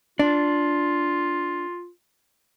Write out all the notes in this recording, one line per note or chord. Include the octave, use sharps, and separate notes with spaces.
D4 F4